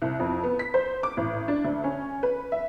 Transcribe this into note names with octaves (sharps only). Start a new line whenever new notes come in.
C2
F2
B3
B6
C5
D6
A1
D4
D2
C#4
B4
E5